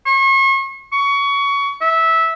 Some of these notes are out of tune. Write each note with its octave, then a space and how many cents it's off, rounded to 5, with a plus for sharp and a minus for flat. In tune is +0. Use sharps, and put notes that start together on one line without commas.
C#6 -40
C#6 +20
E5 -15